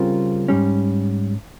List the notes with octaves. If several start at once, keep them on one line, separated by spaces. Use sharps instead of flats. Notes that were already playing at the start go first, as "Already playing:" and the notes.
Already playing: C#3 G3 C4 F4 A#4
G#2 G3 C#4